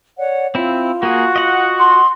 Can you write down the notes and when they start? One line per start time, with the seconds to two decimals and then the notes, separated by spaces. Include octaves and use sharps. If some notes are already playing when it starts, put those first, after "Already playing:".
0.18 C#5 D5 F#5
0.55 C4 E4 F4
1.03 A#3 F#4 G#4
1.36 D#5 F#5
1.79 C6